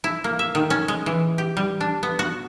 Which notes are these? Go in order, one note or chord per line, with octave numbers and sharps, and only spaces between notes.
E4
A#3
E5
D#3
C#4
G#3
E3
G4
G3
D4
B3
F#4